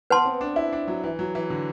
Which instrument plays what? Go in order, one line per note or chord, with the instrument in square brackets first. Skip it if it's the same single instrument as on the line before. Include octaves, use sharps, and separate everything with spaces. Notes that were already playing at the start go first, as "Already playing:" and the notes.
[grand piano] B3 [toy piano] B4 F#5 A5 C6
[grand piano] C4
D4
E4
D4
F#3
E3
F#3
E3
D3